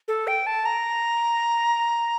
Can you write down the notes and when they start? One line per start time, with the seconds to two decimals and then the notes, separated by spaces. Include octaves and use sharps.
0.08 A4
0.27 G5
0.47 A5
0.65 A#5